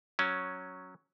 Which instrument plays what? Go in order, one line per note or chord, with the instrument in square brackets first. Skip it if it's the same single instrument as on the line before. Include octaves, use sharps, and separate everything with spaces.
[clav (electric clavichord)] F#3 C#4